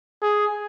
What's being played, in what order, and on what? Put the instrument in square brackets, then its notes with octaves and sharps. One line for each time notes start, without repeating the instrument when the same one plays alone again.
[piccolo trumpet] G#4